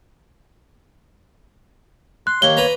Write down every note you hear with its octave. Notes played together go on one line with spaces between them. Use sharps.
C6 F#6
D#2 A#3 C#5 G7
B4 A#5